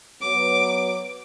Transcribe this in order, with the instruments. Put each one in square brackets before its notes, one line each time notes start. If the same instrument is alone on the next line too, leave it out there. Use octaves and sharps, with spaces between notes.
[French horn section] F#3 B3 [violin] D6